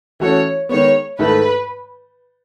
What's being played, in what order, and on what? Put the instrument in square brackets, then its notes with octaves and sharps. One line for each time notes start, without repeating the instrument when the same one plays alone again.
[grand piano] E3 A3 C#4 F#4 A4 [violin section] C#5
[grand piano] D#3 G#3 B3 [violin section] C#5
[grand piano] G#2 D#3 A3 E4 A4 [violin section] B4